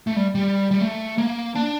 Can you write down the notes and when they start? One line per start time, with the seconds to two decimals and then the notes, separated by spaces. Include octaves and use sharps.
0.07 A3
0.16 G3
0.35 G3
0.71 G3
0.81 A3
1.18 A#3
1.55 D4